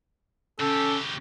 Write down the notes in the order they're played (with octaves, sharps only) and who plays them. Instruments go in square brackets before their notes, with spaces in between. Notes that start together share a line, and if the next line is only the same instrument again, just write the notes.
[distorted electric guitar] C#3 G4 [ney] C#4 [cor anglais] A4